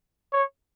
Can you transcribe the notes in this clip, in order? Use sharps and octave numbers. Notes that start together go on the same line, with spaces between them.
C#5